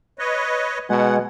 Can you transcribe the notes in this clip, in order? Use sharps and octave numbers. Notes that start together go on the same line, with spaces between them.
B4 C#5 D#5
B2 G#3 F#5